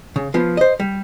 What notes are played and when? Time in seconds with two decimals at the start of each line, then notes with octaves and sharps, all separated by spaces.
0.16 C#3
0.34 F3 B3 F4
0.57 C5 D#5
0.80 G3